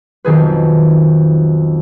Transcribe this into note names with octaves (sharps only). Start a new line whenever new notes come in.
B1 F2 D#3 G#4 B4